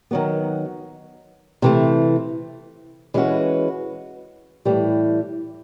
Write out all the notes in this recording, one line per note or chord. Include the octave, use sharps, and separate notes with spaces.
D#3 F#3 B3
C3 E3 A3
E3 G#3 C#4 F#4 B4
A2 E3 G3